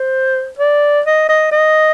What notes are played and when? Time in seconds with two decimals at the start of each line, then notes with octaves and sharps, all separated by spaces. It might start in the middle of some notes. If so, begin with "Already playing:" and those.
Already playing: C5
0.59 D5
1.06 D#5
1.29 D#5
1.52 D#5